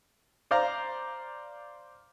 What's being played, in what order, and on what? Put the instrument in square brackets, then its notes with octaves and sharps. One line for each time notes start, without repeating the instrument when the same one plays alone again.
[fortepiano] C5 D5 F5 A#5